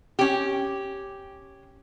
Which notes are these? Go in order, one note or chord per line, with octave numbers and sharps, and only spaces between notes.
C#4 G4